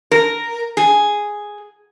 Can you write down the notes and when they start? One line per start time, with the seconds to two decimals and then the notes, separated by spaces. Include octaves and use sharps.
0.11 A#4
0.77 G#4